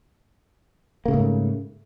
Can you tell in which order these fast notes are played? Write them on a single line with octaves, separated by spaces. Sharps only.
A#3 C#3 A3 G#2